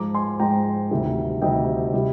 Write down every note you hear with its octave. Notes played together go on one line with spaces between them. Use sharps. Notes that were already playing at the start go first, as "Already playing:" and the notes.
Already playing: G#2 F3 G#3 A#5 D6
G#5 C6
G#2 F3 G#3 G5 A#5
D2 C3 D#3 G3
D2 C3 D#3 G3 D#5 G5
C3 G3